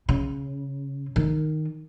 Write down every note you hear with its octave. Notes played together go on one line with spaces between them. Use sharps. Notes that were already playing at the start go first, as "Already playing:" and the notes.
C#3
D#3